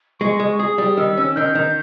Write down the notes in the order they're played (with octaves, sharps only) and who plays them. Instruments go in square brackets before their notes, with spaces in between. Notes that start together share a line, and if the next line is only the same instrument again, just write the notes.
[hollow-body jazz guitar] G#3 [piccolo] C#6
[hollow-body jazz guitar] G#3
[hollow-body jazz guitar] G#4 [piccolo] D#6
[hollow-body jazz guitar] G3
[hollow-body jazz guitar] D#3 [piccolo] E6
[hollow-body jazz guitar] C#4
[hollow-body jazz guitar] D#3 [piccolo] G6
[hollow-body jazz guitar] D#3